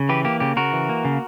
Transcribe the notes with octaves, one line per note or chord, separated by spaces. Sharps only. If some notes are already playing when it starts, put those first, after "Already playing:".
Already playing: C#3
E3 G4 B4
A#3 G4
C#3 G4
C#3 F#4 A#4
E3
A#3
C#3